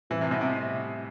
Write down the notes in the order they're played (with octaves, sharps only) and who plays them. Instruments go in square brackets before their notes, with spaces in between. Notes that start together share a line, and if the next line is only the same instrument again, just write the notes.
[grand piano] A2 G3 C4 G4 C5 [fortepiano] E3
[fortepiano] C3
B2
C3